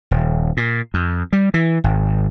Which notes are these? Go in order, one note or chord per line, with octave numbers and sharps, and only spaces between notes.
D#1
A#2
F2
G3
E3
G#1